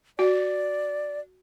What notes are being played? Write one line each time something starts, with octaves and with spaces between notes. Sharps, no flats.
F#4 D5